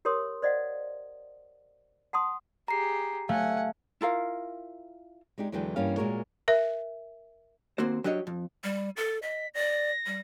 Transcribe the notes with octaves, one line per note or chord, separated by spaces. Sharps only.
G4 A#4 C#5 C6 D#6
C5 D5 D#5 F5 F#5
F#5 A5 C6 D#6
G4 G#4 A#5 C7
A3 F5 F#5 G#5
E4 F4 A#4 F5
G#3 D4 D#4 G4
E2 D3 E3 F#3 G#3 G5
G2 E3 G3 A#3 C#4 F5
A#2 G#3 F#4 A#4 C#5
A#4 E5
D#2 A#3 C4 F#4 C5
F#3 D4 G4 C#5 D#5
F2
G3
A4 A6
D#5 B6
D5 A#6
G3